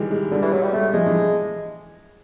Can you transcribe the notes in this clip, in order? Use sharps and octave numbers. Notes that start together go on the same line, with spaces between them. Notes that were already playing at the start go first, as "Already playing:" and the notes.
Already playing: D#3 E3 G3 G#3
G#3
D3 G3
E3
F#3 G#3
G3
G3 A3
F3 G#3
E3